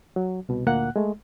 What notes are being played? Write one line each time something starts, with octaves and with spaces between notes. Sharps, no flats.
F#3
C2 B2
D2 A#2 A#3 F#5 F#6
G#3 A3